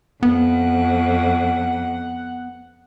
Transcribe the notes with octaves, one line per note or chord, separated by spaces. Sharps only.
F2 B3 F#5